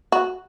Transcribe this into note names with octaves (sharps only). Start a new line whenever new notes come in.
F#4